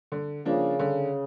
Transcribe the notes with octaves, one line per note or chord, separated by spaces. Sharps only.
D3
C#3 F3 A#3 D4
D3